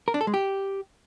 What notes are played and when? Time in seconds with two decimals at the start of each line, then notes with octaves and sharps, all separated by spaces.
0.08 A#4
0.14 D4
0.21 A4
0.27 G#3
0.34 G4